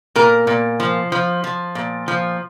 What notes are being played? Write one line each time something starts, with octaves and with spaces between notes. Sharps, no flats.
A#2 A#4
A#2
F3
F3
F3
A#2
F3